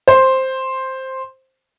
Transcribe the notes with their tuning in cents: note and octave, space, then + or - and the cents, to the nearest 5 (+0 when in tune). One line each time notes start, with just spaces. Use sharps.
C5 +5